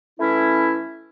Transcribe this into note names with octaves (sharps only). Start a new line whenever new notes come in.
E3 A3 C#4 E4